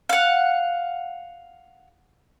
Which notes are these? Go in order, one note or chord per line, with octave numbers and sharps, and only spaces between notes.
F5 F#5